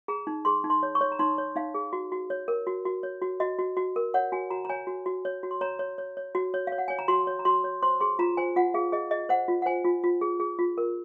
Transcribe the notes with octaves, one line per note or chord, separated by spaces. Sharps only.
G#4 A#5
D#4
G#4 C6
D#4
C6
C#5
C#6
C#5
A#5
D#4 C6
C#5
D#4 F5
G#4
F#4
F#4
C#5
A#4
F#4
F#4
C#5
F#4
F#4 D#5
F#4
F#4
A#4
C#5 F#5
F#4 G#5
F#4 A#5
A#5
C#5 G#5
F#4
F#4
C#5
F#4
C6
C#5 A#5
C#5
C#5
C#5
F#4
C#5
C#5 F5
F#5
C#5 G#5
A#5
F#4 C6
C#5
A#5
F#4 C6
C#5
C5 C6
G#4 C6
F4 A#5
C5 G#5
F4 F#5
G#4 F5
G#4 D#5
G#4 D#5
C5 F#5
F4
F#5
C5 G#5
F4
F4
G#4
G#4
F4
A#4